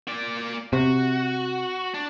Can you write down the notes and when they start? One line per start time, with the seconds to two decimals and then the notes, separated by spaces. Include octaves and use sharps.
0.07 A#3 D5
0.73 C3 F#4
1.94 D4